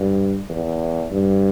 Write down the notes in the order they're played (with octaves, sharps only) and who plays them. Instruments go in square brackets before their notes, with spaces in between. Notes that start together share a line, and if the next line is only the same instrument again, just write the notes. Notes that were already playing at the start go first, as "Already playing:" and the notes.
Already playing: [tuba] G2
E2
G2